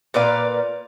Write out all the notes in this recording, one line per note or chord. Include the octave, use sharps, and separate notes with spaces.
A#2 B4 D5 F5